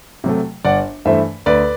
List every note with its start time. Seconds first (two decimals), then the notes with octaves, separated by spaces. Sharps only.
0.24 C3 F#3 A3
0.65 G1 D5 F#5
1.05 G2 E3 A3 C5 E5
1.46 D2 B4 D5